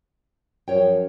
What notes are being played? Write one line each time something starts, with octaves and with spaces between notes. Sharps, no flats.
F#2 F3 C#5 G5